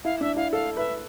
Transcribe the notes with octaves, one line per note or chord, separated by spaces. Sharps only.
E4 F5
D4 E5
E4 F5
A4 F5
B4 E5